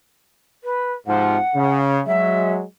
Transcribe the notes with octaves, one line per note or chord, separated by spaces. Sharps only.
B4
G#2 C3 F3 F#5
C#3
F#3 G#3 E5